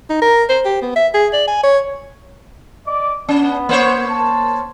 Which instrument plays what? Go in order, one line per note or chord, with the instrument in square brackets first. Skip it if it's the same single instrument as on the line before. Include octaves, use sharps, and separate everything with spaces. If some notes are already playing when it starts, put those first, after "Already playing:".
[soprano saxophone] D#4
A#4
C5
G4
B3
E5
G#4
D5
G#5
C#5
[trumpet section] D5 D#5 D6
[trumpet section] B3 [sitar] C#4
[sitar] A#3 C5 C#5
[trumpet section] A5